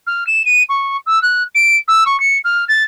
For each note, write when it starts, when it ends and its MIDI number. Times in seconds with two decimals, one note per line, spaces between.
0.07 0.26 89
0.27 0.43 100
0.45 0.63 99
0.69 0.97 85
1.06 1.21 88
1.22 1.43 90
1.55 1.76 98
1.88 2.04 88
2.06 2.19 85
2.20 2.38 97
2.44 2.65 89
2.68 2.83 93